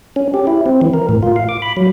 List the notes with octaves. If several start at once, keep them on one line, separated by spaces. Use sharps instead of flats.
C#4
G4
E4
C4
E3
A#4
A2
F4
F5
D6
B5
F#3